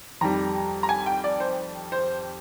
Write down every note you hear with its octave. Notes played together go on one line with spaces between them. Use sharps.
F2 D#3 G3 A#5
A#5
G#5
G5
D5
C5
C5